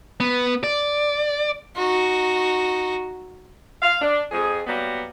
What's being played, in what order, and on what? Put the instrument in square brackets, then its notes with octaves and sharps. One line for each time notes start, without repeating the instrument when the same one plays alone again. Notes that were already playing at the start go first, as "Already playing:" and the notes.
[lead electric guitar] B3
D5
[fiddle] D#4 F#4
[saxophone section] F5
D4
F2 G#4
F#3 G3 A#3 B3